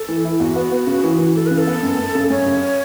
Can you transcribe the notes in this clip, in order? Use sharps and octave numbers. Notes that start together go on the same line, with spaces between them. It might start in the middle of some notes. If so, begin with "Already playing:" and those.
Already playing: A4
E3
E4
E2 F#4
B3
B3
C#3
E3
E3
E3 A4
C#3 B4
A4
B3
F#2
F#2
C#3
F#2 C#5
C#3